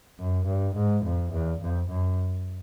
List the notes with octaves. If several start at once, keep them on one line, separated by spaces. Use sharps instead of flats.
F#2
G2
G#2
F2
E2
F2
F#2